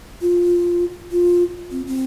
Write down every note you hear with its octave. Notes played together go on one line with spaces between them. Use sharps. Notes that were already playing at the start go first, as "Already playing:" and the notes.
F4
F4
C4
C4